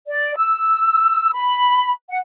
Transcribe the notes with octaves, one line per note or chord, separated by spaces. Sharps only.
D5
E6
B5
F#5